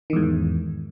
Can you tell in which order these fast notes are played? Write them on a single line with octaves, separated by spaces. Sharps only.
D#3 E2 G#2